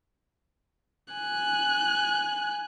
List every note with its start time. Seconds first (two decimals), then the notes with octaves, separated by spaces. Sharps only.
1.14 G#5 F#6